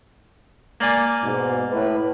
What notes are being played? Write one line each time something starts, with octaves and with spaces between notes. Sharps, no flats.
A#3 D5 G#5
G#2 B2
A2 B4